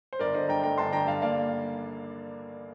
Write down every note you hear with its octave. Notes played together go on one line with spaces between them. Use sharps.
C5
G1 A#4 D5
D3 C5 D#5
G2 G5 A#5
A3 G5 A#5
G1 A5 C6
D3 G5 A#5
G2 F5 A5
A#3 D5 F5